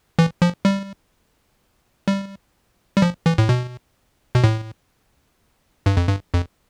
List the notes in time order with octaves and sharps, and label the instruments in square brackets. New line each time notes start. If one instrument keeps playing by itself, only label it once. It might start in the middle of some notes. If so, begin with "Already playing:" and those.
[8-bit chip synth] E3
F3
G3
G3
G3
F3
E3
A2
B2
B2
A2
G2
F2
G2
F2